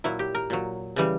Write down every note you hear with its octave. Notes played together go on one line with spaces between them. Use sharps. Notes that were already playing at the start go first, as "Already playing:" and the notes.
A#2 F#3 E4
G4
A#4
A#2 F#3
C#3 E3 G3